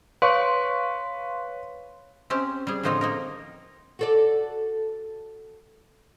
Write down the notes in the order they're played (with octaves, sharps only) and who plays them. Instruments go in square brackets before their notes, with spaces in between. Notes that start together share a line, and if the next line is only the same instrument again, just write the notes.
[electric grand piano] B4 C#6 [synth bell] C#5 F5 C6
[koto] C4 C#4 G4
G3 G#4
A2 D3 F3 C4 D#4 C#5
A#3 D#4 A#4
[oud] F#4 A4 D5